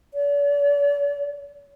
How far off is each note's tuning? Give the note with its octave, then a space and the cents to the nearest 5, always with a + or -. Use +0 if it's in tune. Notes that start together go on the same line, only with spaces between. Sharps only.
D5 -45